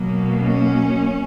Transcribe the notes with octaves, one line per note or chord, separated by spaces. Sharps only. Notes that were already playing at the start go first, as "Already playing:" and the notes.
Already playing: B2 F#3 A#3
C#4